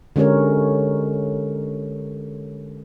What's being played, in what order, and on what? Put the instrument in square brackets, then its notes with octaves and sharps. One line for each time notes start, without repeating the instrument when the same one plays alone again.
[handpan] D3 G#3 C#4 G4 A#4 C#5